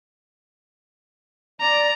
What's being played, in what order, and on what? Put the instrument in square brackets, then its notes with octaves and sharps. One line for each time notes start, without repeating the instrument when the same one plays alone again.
[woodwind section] D5 [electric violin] A#5